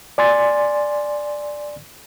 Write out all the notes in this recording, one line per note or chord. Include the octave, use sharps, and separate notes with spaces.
D5 G#5 C6 A6